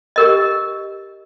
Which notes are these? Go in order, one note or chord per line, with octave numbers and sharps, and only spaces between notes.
G4 A#4 D#5